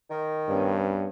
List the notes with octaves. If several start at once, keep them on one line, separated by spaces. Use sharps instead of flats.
D#3
G2 B3 C#4